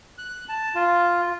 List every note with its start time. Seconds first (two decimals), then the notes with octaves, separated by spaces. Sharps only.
0.18 F#6
0.49 A5
0.75 F4